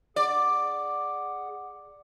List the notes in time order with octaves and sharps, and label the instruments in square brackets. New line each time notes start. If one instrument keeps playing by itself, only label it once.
[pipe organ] G#4 F#5 [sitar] D5